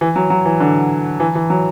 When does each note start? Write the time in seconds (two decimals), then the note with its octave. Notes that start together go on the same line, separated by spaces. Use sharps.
0.01 E3
0.16 F#3
0.30 F#3
0.45 E3
0.60 D3
1.20 E3
1.35 E3
1.50 F#3